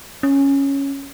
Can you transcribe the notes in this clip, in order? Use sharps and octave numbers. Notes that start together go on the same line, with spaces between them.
C#4